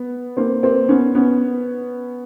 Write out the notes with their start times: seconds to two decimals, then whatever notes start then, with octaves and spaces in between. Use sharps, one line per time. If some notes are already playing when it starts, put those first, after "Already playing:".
Already playing: B3
0.37 A#3 C4
0.63 A#3 C4
0.89 B3 C#4
1.15 B3 C#4